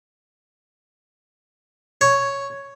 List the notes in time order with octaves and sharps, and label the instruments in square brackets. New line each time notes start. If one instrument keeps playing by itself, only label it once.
[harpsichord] C#5